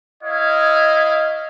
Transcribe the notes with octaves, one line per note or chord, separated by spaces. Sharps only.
E4 C#5 D#5 F5